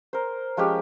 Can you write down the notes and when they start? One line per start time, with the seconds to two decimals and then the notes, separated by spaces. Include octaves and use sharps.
0.13 A#4 C5
0.57 F3 G#3 C#4 G4